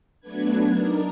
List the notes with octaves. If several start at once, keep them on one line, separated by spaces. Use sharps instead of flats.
F#3 A3 B3 D4 B4 G#6
D4 D#4 A#4 D5